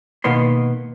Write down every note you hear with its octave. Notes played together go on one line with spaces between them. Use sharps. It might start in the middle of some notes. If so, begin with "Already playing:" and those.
B2 D#3 A#3 B3 C6